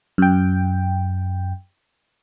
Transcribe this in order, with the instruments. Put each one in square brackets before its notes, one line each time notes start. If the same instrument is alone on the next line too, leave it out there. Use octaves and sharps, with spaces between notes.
[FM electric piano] F#2 G5